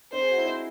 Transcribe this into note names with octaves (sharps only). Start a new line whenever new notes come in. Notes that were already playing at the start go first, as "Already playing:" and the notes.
C4 D#4 C5
G#4
F#4
E4
C4 D#4